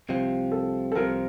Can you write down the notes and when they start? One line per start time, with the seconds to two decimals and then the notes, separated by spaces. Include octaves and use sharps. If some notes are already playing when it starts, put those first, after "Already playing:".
0.09 C2 C3 F3
0.52 A4
0.92 A4
0.96 C2 C3 F3 A#4